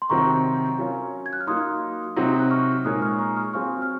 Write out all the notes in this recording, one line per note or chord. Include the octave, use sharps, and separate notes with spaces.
C6
C3 D#3 F#3 C4 F#4 A#5 C#6
F#3 C#4 F4 A#4 C#5
G#6
F#6
F6
F#3 A#3 D#4 C6 D#6
C3 F#3 C4 D#4 F#4
F#6
C#6 F6
A#2 G#3 D#4 A#4 C#5 D#6 F#6
C#6 F6
D#6
A#5 C#6
C#6 F6
F#3 C4 F4 G#4 C#5 C#6 F6
F6